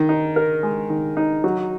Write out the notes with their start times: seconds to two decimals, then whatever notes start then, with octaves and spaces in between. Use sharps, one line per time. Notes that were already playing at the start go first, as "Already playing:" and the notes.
Already playing: D#3
0.09 D#4
0.36 A#4
0.63 G#3
0.90 D#3
1.17 D#4
1.44 F#3